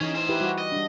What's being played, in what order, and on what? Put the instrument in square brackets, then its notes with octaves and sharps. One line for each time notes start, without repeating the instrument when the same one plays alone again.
[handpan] E3 D#4 [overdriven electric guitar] C#4 G#4
[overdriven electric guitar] G#4 C5
[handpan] E4 G4 B4
G3 F#4
[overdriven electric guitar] D#5
[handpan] G3 D4